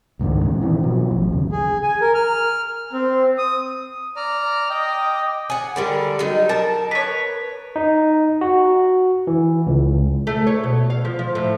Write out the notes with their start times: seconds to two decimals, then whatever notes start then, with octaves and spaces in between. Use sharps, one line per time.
0.19 C#2 G#2 D#3 D4
0.45 A#2 E3 C#4
0.61 D#3 E3 C4
0.83 B2 F3 F#3
1.11 A1
1.30 D#2 C#3
1.52 G#4
1.83 G#5
2.01 A#4
2.14 F6
2.93 C4
3.38 D#6
4.16 D5 A#5 F6
4.70 D#5 G5 D6 D#6
5.50 F#5 G#5
5.76 D3 G3 A#4
6.19 F#3 D#4
6.49 A#4 A5
6.91 B4 C#5
7.76 D#4
8.41 F#4
9.27 E3
9.67 C#2
10.27 A3
10.47 C#5
10.63 B2
10.90 F5
11.05 F3
11.19 F3
11.35 A2